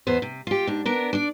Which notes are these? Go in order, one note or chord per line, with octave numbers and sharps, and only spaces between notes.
E2 B3 C5
C3
F4 G4
G#2 D4
B3 D4 A#4
D4 D5